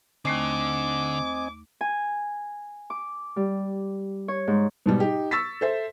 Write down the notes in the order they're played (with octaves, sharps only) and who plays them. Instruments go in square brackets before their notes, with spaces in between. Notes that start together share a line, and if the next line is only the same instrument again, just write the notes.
[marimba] D#2 A3 C#6 [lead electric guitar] D3 [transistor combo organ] C4 D#5 G#5 [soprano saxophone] D6
[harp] G#5
D6
G3
C#5
G#2
[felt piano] G#2 B2 G3
D#4 G4
C#6 E6 A6 B6
A4 C5 E5